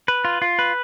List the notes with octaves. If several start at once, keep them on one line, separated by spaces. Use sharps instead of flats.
B4
F4
F4
B4